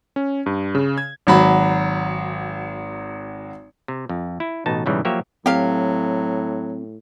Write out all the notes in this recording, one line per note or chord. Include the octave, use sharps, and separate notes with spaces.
C#4
G2
C#3
G#6
G#1 F#3 B5
C3
F2
E4
A1 B2 D#4 A5
B1 G#2 C#3 E3 G3
F3 F#3 A#3 G4 C#5 E5
A2 F#3 C4 G4 F5